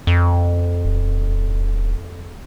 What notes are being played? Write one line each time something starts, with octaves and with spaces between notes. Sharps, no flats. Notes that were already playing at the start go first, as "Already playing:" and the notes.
F2
D#1